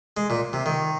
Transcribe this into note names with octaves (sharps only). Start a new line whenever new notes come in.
G#3
A#2
C3
D#3